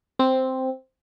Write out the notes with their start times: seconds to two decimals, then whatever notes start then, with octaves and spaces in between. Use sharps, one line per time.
0.19 C4